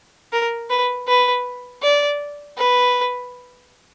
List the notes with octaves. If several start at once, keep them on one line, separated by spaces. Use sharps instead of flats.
A#4
B4
B4
D5
B4